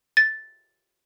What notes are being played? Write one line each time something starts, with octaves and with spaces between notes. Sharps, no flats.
A6